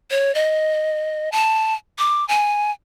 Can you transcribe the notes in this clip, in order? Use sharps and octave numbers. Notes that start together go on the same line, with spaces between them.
C#5
D#5
A5
D6
G#5